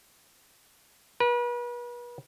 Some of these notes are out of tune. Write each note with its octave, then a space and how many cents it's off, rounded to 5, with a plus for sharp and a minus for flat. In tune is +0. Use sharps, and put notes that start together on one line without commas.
B4 -40